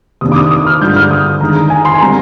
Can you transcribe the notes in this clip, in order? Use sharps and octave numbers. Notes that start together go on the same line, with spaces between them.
C3 D#3 A#3 D4 D#6
D6
D#6
D#6
F6
G2 D3 G#3 D4 F4 G6
F6
D#6
D#3 G#3 D4 A#5
A#5
G#5
C6
G#5
D3 G3 C4 A#5